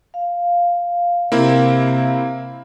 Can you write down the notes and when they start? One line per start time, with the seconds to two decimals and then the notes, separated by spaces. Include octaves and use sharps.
0.14 F5
1.32 C3 A#3 C4 E4